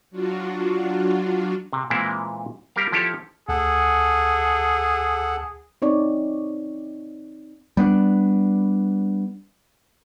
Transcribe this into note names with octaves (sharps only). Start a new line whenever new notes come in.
F#3 D4 F4 F#4
C3
A#2 E3 G#3 A#3 C4 E4
G3 G4 A#4 F5
F3 E4 G4 A4 C#5
D2 G#4 A4 F#5
C4 D#4 C#5 D5
G3 B3 C4 D4